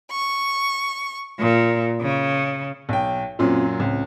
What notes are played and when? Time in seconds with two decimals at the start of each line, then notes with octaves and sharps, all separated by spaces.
0.12 C#6
1.38 A#2
2.01 C#3
2.89 B1 G5
3.39 F#2 A#2 F#3 C4 C#4 F4
3.80 C#2 A2 C4